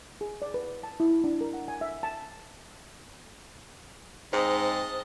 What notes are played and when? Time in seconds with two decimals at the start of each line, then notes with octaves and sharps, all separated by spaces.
0.21 G#4
0.42 D5
0.54 B4
0.83 A5
1.00 E4
1.24 D4
1.41 A#4
1.54 F#5
1.68 G#5
1.81 E5
2.03 A5
4.33 G#2 C4 C5 D#5 A5